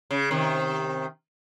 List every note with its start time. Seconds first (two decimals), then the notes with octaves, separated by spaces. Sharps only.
0.11 C#3
0.31 C3 D#3